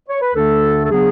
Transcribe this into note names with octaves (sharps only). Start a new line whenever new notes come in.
C#5
B4
D2 D3 A3 D4 A4
A4
C#3 F#3 B3 D4 G#4